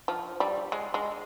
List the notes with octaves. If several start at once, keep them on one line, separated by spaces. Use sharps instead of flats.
F3
G3
G#3
G#3